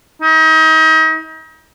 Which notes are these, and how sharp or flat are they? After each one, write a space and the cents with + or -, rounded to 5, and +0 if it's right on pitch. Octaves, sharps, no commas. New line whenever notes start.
D#4 +35